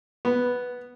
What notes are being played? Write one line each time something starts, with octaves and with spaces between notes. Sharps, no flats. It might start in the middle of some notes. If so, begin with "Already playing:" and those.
B3